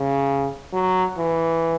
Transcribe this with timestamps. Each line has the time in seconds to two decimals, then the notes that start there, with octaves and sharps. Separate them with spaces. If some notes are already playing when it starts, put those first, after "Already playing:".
Already playing: C#3
0.73 F#3
1.18 E3